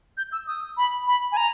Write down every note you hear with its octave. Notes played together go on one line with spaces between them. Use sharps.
G6
E6
D#6
B5
B5
G#5
A#5